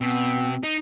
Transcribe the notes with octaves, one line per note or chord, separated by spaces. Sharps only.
B2 B3 C4
D#4